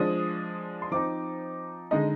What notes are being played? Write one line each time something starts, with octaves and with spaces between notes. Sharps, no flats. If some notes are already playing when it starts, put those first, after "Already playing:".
Already playing: F3 G#3 D4 D#6
C6
F3 C4 D#4 D6
D3 G#3 D#4 D#5